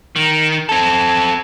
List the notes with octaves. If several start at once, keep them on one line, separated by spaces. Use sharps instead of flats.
D#3
C4 A4